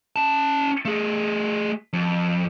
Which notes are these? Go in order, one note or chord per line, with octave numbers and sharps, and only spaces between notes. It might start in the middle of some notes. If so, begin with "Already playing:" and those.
C#4 A5
A3 G#4
F2